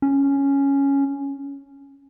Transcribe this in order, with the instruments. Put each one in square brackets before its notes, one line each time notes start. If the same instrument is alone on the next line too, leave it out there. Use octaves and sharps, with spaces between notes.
[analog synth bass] C#4